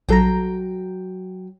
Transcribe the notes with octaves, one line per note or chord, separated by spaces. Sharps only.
A#1 F#3 A4 G5 A#5